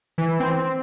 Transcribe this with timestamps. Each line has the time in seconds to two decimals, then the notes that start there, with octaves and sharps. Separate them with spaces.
0.18 E3
0.40 C4